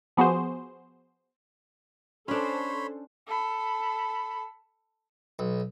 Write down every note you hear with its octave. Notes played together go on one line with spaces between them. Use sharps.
F3 B3 F#4 G#4 C5
C#4 D4 A4 C5 C#5 B5 C6
A4 B5
B1